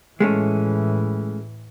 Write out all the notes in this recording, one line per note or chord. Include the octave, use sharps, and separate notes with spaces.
A2 E3 G#3 A3 C#4